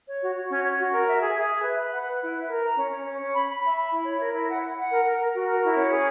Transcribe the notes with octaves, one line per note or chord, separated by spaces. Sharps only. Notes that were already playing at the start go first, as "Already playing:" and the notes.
C#5
F#4
F#4
C#4
C#4
F#4
A#4
E5
G#4
G#4
E5
B4
B5
F#5
B4
E4
E5
A#4
A#5
C#4
C#4
C#4
C#4
B5
B5
E5
B5
E4
C#5
A#4
E4
F#5
F#5
F#5
A#4
A#4
A#4
F#4
A#4
E4
C#4
G#4